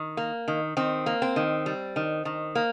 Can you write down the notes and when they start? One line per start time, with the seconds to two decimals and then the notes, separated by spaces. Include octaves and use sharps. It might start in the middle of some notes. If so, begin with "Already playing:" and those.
Already playing: D#3
0.17 A#3
0.48 D#3
0.77 D#3 C4
1.06 A#3
1.22 C4
1.36 D#3
1.66 G3
1.96 D#3
2.25 D#3
2.55 A#3